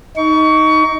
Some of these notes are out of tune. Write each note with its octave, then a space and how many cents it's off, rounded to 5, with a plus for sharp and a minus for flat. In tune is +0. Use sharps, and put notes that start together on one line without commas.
D#4 +10 C#6 +25